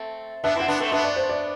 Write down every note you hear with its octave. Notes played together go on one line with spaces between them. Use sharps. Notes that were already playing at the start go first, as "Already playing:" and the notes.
Already playing: A3 C4
B3 D4 E5
C4 E4 F#5
B3 D4
A3 C4
B3 D4 E5
D5
C5
D5